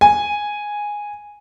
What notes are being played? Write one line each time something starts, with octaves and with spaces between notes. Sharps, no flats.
G#5